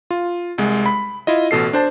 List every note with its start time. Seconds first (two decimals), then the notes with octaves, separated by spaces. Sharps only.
0.11 F4
0.58 C2 G#3
0.86 B5
1.27 E4 F4 D#5
1.51 A1 B2 A4 C7
1.73 D4 C5 A5